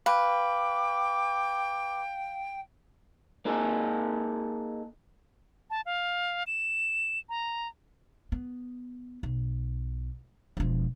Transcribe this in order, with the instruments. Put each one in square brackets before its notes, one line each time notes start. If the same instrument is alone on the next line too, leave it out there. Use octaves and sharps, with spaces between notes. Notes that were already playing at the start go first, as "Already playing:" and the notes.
[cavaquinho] B4 [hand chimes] F5 [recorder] G5 [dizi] D6
[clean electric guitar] A#3 D#4 G#4 A4
[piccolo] A5
F5
E7
A#5
[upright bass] B3
B1
E1 F3